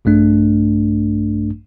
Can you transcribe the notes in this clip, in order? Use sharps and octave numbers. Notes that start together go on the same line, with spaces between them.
A#1 G2 A3 D4